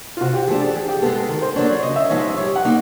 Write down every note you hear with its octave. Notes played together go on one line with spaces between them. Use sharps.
F4
C3 F#4
G4
F3 A3 D4 G#4
A4
E3 G#4
G4
G#3 B3 A4
A4
D#3 A#4
C5
F#3 A#3 D4 C#5
C#5
C#3 D#5
E5
F3 G#3 B3 D#4 C#5
G3 C#5
F#5
A#3 D#4